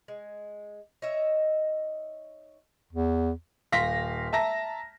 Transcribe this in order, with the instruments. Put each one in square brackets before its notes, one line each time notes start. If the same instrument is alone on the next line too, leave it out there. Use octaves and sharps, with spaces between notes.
[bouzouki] G#3
D#4 C#5 D#5 E5
[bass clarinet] E2
[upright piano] D#1 F5 C6 A#6 B6
E5 A5 A#5 A#6